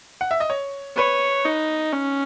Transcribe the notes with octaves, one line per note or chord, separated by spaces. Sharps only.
F#5
E5
D#5
C#5
B4 C#5
D#4
C#4